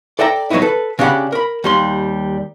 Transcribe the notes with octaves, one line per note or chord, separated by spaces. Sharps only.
A4 D5 E5 G5 A#5
D#3 F#3 A3 B3 D#4 E4
A4 B4
C#3 D4 E4 G4 F#5 B5
A#4 B5
D#2 G3 C6